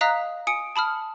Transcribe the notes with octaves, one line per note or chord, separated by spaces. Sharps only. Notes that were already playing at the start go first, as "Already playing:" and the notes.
D#5 F5 A#5 D#6 F#6 B6
G#5 D#6 C#7 D7
A5 B5 D#6 F6